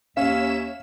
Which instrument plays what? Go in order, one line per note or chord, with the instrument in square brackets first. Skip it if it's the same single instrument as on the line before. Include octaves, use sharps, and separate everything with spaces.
[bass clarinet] D#2 [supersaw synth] C#4 E7 [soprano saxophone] E5 [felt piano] F5